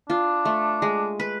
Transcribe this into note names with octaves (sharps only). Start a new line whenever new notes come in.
D4 F4
A3
G#3
B4